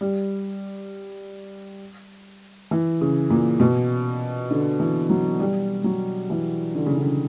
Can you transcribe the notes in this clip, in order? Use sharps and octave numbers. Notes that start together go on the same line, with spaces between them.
G3
E3
C#3
A#2
B2
D3
E3
F#3
G3
F#3
E3
D3
C#3
D3